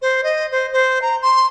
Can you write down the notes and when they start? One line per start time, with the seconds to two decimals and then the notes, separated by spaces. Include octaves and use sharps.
0.02 C5
0.23 D#5
0.51 C5
0.72 C5
1.02 A#5
1.22 C6